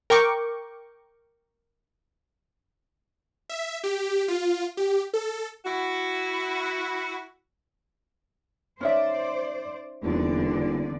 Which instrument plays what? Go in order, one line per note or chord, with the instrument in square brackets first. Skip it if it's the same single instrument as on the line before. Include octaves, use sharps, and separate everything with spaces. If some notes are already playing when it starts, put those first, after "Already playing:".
[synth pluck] A#4 G5 C#6 D6
[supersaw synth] E5
G4
F4
G4
A4
[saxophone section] E4 F#4
[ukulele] C#4 D#4 E5 [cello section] C5 D5
[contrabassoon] D#1 [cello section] E2 D3 D5